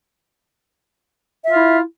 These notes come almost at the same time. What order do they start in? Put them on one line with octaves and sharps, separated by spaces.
E5 F4 E4